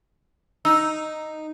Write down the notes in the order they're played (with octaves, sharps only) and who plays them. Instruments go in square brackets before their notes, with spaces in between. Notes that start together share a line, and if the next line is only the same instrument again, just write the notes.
[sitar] D#4 [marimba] E6